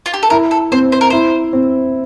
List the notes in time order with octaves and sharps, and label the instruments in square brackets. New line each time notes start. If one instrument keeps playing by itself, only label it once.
[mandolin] F4
G4
A4
[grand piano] E4 [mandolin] A#4
[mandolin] A4
[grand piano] C4 [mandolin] C5
[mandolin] C5
A#4
[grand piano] E4 [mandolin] C5
[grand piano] C4